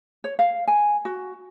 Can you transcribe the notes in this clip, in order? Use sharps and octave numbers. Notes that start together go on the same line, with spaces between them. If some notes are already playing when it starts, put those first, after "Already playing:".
C#5
F5
G#5
F#4